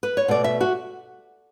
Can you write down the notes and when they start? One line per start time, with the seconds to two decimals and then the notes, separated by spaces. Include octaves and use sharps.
0.03 B4
0.17 C#5
0.28 B2 A3 D5
0.44 E5
0.61 F#4